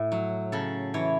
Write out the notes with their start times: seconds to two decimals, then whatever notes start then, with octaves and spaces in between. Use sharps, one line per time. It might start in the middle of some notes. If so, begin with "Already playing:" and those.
Already playing: A2
0.12 F#3
0.52 C#3 A4
0.94 E3 C#5